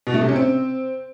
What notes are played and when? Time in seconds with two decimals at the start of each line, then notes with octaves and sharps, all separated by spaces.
0.07 B2
0.14 A3
0.21 C3
0.29 C#4
0.36 C4